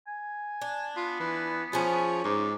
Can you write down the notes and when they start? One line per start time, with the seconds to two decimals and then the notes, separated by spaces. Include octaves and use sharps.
0.07 G#5
0.61 D4
0.96 B3 F4
1.20 E3
1.73 F3 C#4 G#4
2.24 G#2 D6